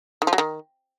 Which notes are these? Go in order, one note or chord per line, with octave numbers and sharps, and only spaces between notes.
D#3
F3
F#3
D#3